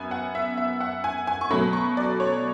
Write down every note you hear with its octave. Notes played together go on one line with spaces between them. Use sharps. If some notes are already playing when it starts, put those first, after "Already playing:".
Already playing: F#2 B3 G#5 B5
F#5
E5
E5
F#5
G#5
G#5
C#6
B2 F#3 A3 B5
C#6
D5
C#5